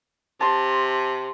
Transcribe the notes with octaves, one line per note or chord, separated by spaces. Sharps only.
C3 A5 C6